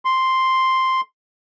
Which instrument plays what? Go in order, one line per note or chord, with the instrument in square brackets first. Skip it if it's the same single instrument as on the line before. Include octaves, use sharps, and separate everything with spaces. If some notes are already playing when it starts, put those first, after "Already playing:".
[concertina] C6